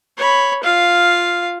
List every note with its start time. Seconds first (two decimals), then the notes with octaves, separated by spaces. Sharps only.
0.18 C#5 B5
0.64 F4 F5